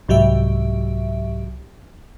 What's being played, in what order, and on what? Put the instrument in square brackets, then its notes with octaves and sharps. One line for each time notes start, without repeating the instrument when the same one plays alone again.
[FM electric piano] C2 G#2 F#3 G4 E5